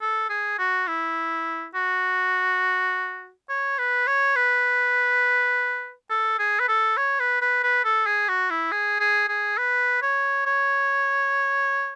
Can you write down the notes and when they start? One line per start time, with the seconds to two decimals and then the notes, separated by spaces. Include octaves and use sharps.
0.01 A4
0.29 G#4
0.59 F#4
0.87 E4
1.74 F#4
3.49 C#5
3.78 B4
4.07 C#5
4.36 B4
6.10 A4
6.39 G#4
6.60 B4
6.68 A4
6.97 C#5
7.20 B4
7.41 B4
7.63 B4
7.84 A4
8.06 G#4
8.28 F#4
8.50 E4
8.71 G#4
9.00 G#4
9.29 G#4
9.58 B4
10.02 C#5
10.46 C#5